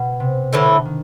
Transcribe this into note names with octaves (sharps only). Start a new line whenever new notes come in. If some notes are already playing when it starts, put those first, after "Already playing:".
Already playing: B2
C3
A2 D3 E3 A3
D#3